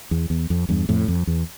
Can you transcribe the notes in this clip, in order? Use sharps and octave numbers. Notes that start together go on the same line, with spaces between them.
E2
E2
F2
E2 G2
F2 A2
F2
E2